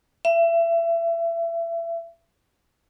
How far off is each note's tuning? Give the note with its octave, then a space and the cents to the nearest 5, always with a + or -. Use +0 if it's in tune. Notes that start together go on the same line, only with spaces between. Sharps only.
E5 +30